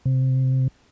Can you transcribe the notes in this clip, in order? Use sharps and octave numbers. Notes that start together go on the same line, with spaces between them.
C3